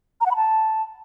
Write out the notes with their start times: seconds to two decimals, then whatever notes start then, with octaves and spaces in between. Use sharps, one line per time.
0.21 A#5
0.26 F#5
0.31 B5
0.36 A5